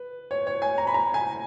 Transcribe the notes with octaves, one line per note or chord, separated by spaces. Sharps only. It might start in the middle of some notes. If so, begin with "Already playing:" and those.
Already playing: B4
C#5
C#5
G#5
A#5
B5
A#5
G#5